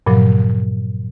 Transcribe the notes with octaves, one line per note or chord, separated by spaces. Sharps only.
G2 A#2 C#3 F3 F#3